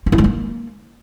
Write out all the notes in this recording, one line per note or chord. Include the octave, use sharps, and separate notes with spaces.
F4
E4
G#3
A#3